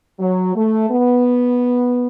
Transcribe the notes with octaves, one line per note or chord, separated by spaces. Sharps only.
F#3
A3
B3